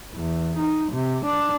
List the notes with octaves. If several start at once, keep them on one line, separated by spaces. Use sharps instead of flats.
E2
D#4
C3
D4